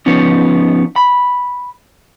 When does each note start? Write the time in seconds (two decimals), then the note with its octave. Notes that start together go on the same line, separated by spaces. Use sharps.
0.06 F3 B3 C#4 D#4
0.96 B5